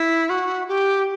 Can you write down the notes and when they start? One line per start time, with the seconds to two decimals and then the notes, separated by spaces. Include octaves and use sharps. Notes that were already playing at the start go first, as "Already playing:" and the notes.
Already playing: E4
0.30 F#4
0.68 G4